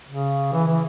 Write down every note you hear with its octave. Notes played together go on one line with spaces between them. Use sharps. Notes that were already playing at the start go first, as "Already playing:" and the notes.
C#3
E3
E3